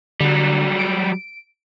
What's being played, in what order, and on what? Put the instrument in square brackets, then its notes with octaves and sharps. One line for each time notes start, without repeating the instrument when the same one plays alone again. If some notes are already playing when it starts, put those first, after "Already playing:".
[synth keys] D3 [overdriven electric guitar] F#3 G3
[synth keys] D7